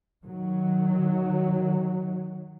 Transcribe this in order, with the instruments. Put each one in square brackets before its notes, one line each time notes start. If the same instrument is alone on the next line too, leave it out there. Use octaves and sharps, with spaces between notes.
[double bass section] D#3 F#3